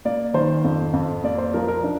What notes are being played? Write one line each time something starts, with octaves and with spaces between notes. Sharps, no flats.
A#3 D5
D#3 C5
F2
F2
A#3 D5
C5
F3 A#4
A#4
D4